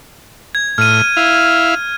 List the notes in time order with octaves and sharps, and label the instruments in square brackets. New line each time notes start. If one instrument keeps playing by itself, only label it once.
[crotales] G#6
[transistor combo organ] A2 [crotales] F6 D#7
[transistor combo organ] E4 F5